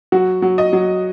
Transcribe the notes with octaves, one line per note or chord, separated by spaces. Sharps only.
F#3 F#4
F#3
D#5
F#3